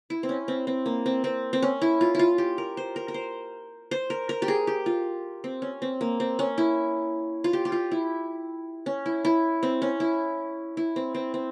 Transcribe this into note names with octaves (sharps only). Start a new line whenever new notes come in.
E4
C4
C#4
C4
C4
A#3
C4
C4
C4
C#4
E4
F4
E4 F4
G4
A#4
C5
A#4
A#4
C5
C5
A#4
A#4
G4
G#4
G4
F4
C4
C#4
C4
A#3
C4
C#4
E4
F4
G4
G4
F4
E4
C#4
E4
E4
C4
C#4
E4
E4
C4
C4
C4